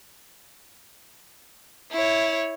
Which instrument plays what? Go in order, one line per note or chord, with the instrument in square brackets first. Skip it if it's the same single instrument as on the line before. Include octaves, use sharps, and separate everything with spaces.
[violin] E4 C#5